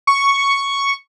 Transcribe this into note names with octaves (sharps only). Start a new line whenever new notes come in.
C#6